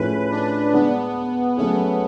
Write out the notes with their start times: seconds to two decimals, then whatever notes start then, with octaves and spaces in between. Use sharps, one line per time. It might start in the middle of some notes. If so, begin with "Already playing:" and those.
Already playing: A2 F3 A3 C#4 G#4 B4
0.31 D4
0.73 G#3 B3 D4 G#4 B4
1.57 F#3 A3 B3 C#4 G#4